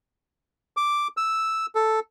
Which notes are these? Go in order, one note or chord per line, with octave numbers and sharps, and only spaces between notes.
D6
E6
A4